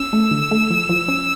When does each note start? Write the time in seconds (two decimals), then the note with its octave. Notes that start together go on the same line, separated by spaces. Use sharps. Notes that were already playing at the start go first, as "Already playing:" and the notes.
Already playing: C#4 E6
0.13 A3
0.31 D3
0.51 A3
0.71 F3
0.89 F3
1.08 C#4